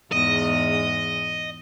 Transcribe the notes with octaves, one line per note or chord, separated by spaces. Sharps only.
E2 G#2 D#5